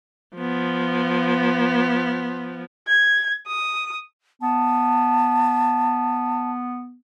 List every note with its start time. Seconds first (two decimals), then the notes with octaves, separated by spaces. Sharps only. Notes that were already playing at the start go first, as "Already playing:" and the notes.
0.36 F3 B3
2.87 G#6
3.47 D#6
4.42 B3 A5